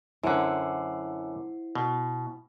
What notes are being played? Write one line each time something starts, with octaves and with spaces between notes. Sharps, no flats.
F#2 D3 E4 C5 F#5
B2